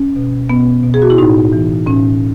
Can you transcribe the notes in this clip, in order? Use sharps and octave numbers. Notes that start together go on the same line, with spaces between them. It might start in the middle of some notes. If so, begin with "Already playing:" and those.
Already playing: C#4
B2
B2 B3
B2
G#4
F#4
E4
A2 D#4
E3
A2 C#4